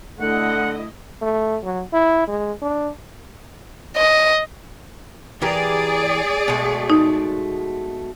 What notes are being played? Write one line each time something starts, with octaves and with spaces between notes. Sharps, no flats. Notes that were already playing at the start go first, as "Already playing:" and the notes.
D3 A3 E4 D#5 F#5
A3
F#3
E4
G#3
D4
D#5
E3 G4 G#4 A#4 D5
B2 G#3 A3
D#4